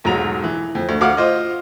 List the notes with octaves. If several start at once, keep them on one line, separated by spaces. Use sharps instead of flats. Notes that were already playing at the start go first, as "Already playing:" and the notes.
E1 B1 G#2 F#3 A#5 F7
E3
F2
D2
D2 F#4 F5 F#5 D6 F6
F4 C5 D#5